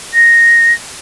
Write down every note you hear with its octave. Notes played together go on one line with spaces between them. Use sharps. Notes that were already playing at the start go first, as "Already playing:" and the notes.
A#6